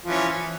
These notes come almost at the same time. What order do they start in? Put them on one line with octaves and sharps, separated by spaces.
F3 E3 C#4